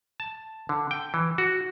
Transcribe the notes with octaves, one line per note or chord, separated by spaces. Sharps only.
A5
D3
G5
E3
F#4